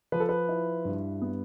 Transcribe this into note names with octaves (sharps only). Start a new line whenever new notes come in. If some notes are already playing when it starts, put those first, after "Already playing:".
F3 B4
A4
B4
E4
G2
B3